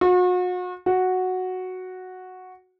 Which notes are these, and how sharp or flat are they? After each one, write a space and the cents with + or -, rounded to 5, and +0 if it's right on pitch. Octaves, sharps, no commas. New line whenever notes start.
F#4 -40
F#4 -5